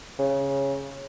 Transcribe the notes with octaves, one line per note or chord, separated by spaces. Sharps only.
C#3